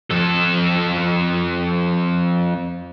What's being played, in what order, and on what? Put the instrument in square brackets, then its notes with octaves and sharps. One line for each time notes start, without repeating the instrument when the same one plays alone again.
[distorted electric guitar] F2 A4